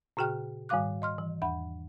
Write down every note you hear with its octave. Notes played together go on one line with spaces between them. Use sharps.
A#2 C#3 F#4 G#4 G5 F6
G#2 D#3 G3 F5 D6 F#6
D#5 C6 F6
E3
E2 F#5 B5